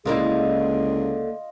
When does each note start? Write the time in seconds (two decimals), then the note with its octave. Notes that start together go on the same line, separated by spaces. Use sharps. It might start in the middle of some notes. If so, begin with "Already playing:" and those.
0.05 C#2 D3 A#3 E4 F4 G#4 D#5